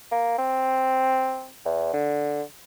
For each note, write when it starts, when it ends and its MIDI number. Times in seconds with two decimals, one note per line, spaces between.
0.12 0.37 58
0.38 1.48 60
1.65 1.92 40
1.94 2.42 50